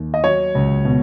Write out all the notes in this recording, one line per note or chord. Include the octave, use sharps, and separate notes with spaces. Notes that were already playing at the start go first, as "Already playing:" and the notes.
Already playing: D#2
D#5
F#3 C#5
C#2
B2